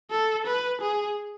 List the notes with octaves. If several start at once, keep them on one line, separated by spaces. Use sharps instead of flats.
A4
B4
G#4